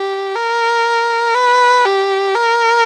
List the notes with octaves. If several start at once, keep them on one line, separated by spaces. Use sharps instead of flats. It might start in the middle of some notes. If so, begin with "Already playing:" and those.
Already playing: G4
A#4
B4
G4
A#4